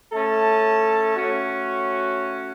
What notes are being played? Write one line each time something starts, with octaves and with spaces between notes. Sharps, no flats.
A3 C#4 A4 A5
A3 C#4 F#4